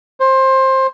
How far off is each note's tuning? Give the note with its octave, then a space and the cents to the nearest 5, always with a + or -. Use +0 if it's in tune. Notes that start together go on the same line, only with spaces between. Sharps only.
C5 +20